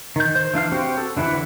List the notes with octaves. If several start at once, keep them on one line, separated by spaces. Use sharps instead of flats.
D#3 G6
C5
E3 D4 F5 F6
C4 F#4 G4 C5
A4
D3 E3 E4 B4 F#5